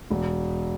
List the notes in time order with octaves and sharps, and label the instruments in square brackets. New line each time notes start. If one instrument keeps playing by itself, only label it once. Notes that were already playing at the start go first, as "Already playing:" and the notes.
[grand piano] E1